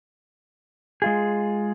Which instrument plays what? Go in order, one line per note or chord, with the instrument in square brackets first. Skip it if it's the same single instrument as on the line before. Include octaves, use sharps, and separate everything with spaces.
[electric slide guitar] G#3 F4 G#4